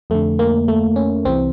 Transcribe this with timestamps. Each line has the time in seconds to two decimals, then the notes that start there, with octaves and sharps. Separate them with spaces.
0.10 F2 D3 A3
0.39 A#3
0.68 A3
0.96 C#4
1.25 C2 C3 E3 C4